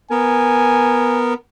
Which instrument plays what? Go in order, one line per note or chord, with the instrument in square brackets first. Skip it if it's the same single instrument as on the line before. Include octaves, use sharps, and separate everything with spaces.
[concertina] B3 A#4 [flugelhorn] G#5